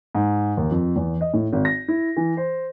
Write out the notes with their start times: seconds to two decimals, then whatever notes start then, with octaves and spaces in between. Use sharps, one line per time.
0.15 G#2
0.57 D#2
0.71 F2
0.96 E2
1.21 D#5
1.33 A2
1.53 G#1
1.65 A#6
1.88 E4
2.17 E3
2.37 C5